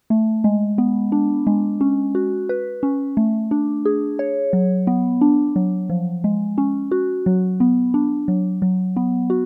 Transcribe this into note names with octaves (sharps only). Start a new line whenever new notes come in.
A3
G#3
B3
D4
G#3
C#4
F#4
B4
C#4
A3
D4
G#4
C#5
F#3
B3
D4
F#3
F3
G#3
C#4
F#4
F#3
B3
D4
F#3
F#3
B3
F#4